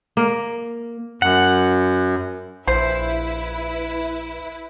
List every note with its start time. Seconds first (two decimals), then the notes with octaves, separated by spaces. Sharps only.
0.17 A#3
1.22 F#2 F#5
2.68 A#1 E4 B4 C5